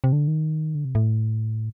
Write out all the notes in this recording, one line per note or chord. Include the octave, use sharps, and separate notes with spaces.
C3
D3
D#3
D3
C3
A2